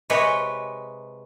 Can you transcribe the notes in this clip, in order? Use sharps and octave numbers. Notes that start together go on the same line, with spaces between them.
C3 G#3 G4 B4 C#5